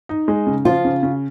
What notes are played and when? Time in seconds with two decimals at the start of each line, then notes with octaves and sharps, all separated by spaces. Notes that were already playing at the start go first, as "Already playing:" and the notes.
0.09 D#4
0.28 G#3
0.47 C#3
0.65 F3 F4
0.85 C#3
1.03 C#3